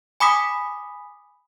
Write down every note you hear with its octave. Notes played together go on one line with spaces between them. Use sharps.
G#5 B5 D6 D#6 B6